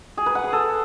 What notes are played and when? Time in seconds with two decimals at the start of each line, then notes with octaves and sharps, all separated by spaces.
0.17 G#4
0.26 B4
0.35 F#5
0.44 G#4
0.53 A4